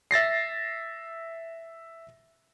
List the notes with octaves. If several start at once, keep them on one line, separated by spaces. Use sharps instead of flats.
E5 A6 A#6 C7